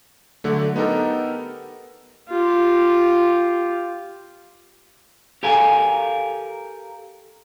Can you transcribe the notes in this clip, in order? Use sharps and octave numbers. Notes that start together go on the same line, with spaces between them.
D3 F#3 A3
B3 D#4 G4 A4 A#4
F4 G4
G4 A4 A#4 F5 G#5